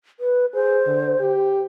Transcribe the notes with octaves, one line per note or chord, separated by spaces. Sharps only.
B4
G#4 C5
D3
G4